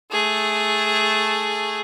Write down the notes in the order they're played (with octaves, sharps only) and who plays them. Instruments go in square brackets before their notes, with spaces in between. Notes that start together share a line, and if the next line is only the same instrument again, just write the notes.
[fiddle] A3 G#4